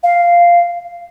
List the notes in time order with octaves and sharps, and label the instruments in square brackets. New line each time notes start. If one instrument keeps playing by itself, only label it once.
[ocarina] F5